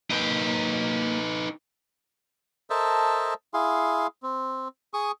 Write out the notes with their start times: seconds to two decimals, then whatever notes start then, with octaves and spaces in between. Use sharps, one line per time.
0.10 A#3 D#4 B4 G5
2.70 A4 A#4 C5 D#5 E5 A5
3.54 E4 G#4 F5 C6
4.23 C4
4.94 G#4 C#6 D#6